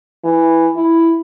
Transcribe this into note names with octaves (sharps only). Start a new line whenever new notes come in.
E3
E4